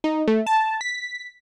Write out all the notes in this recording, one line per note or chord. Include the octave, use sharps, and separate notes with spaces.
D#4
A3
A5
B6